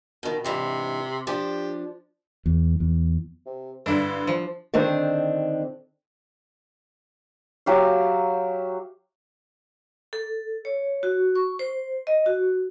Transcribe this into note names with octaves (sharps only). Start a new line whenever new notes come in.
B2 D#3
G#2 C3 E3 D4
F3 D4 G4
E2
E2
C3
G2 D3 D4 E4 B4
F3
D3 D#3 C4 D4
F#3 G4 E5 F5
A4
C#5
F#4
C#6
C5
D#5
F#4